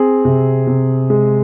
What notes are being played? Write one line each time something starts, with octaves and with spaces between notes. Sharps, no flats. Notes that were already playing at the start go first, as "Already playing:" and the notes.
Already playing: C4 G#4
C3
C3
G#3